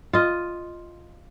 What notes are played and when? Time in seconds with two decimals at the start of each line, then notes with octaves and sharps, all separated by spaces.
0.13 F4 D#5